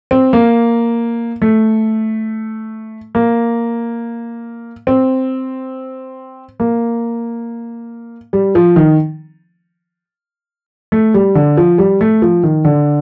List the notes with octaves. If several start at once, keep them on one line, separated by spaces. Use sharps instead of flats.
C4
A#3
A3
A#3
C4
A#3
G3
F3
D#3
A3
G3
D3
F3
G3
A3
F3
D#3
D3